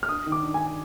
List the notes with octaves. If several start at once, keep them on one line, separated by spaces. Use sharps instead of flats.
F6
D4 D#6
D#3
D6
D4
G#5